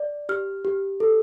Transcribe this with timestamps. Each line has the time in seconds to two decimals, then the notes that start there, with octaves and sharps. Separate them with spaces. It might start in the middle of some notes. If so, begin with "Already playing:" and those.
Already playing: D5
0.29 G4 F6
0.65 G4
1.00 A4